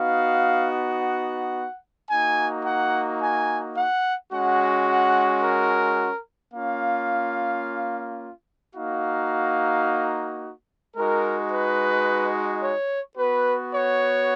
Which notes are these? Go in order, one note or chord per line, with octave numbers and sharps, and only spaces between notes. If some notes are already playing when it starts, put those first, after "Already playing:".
Already playing: B3 D#4 F#4 F5
F#5
A#3 D#4 F#4 G#5
F#5
G#5
F#5
G#3 C#4 F#4 F#5
F#5
A#4
A#3 C#4 F4 F5
A#3 D#4 F#4 F5
G#3 D#4 F#4 A#4
B4
C#5
B3 F#4 B4
C#5